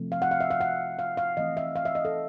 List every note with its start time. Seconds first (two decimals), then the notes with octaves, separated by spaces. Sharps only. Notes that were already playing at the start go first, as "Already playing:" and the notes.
Already playing: C3 F3 A3 C4
0.12 F5
0.22 F#5
0.31 F5
0.41 E5
0.51 F5
0.61 F#5
0.99 F5
1.17 F5
1.37 E3 A3 C4 D#5
1.57 E5
1.76 F5
1.85 E5
1.95 D#5
2.05 A4